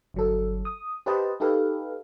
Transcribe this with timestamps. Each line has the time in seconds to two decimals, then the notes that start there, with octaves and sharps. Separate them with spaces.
0.14 G1 F#3 A4
0.65 D#6
1.06 G4 B4 C5 D#5 A5
1.40 D#4 G4 A4 B4 F5